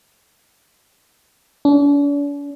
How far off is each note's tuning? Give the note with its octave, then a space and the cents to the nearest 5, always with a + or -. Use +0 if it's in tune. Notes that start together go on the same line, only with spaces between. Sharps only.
D4 -45